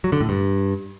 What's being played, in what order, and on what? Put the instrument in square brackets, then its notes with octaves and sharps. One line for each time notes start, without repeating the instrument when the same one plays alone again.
[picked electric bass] F#3
D3
A2
G2